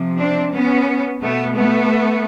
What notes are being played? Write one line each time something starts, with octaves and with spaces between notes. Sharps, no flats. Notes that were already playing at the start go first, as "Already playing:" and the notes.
Already playing: C3 F3
C4 D4
B3 C#4
B2 A3 B3
A3 B3